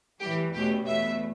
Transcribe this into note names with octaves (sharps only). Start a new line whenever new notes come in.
A2 E3 G3 G4
E2 B2 A3 C#4 G4
E2 B2 A3 E5